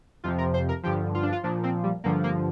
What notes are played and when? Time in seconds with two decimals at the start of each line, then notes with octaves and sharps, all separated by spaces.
0.24 F2 C3 F3 F4
0.38 A#4
0.54 C5
0.69 A#4
0.83 G2 D3 F3 G4
1.15 F4
1.23 D4
1.32 F4
1.43 A#2 F3 D4
1.63 C4
1.84 G3
2.04 G2 D3 F3 A#3
2.24 A#3